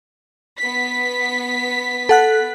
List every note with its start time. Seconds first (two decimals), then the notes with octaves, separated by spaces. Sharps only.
0.59 B3 B6
2.09 A4 F#5 F#6